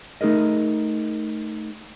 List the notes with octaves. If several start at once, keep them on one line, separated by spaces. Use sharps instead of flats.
A3 D#4 G#4 A#4 D#5